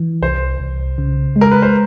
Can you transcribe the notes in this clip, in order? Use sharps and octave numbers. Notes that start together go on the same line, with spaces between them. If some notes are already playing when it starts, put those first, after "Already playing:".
Already playing: E3
C2 C5
C2
C#3
G#3
A#4
B4
C5